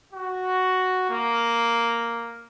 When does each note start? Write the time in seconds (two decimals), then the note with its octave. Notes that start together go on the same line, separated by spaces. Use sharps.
0.13 F#4
1.10 A#3